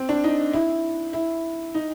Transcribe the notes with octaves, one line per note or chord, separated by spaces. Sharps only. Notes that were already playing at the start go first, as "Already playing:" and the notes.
Already playing: C4
D4
D#4
E4
E4
D#4